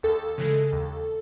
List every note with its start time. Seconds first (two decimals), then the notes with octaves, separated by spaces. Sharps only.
0.03 D#2 A4
0.38 C#3 E3 G#3
0.73 D#2